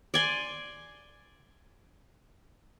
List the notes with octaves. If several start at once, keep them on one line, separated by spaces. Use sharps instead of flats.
D5 G#5 C6